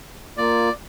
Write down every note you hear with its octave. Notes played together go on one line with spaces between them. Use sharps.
A#3 F4 D5